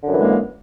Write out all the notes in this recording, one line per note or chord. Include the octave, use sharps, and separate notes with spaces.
F#2 D3 E3 G#3 A#3